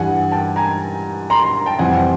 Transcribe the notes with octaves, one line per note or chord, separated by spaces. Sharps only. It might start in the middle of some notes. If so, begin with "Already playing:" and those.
Already playing: G2 E3 G3 F#5 G#5
G5 A5
G#5 A#5
A#5 C6
A#5 C6
G5 A5
F2 C3 E3 G3 F#5 G#5